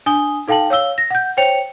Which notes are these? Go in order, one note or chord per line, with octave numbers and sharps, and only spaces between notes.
D4 G#5 D#6 G7
D#4 A4 F5 G5 A5 F#7
C#5 F5 E6 G7
A#6
F#5 G6
C5 C#5 G5 C#7 F7